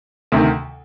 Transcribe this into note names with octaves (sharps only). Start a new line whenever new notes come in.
D2 C3 D#3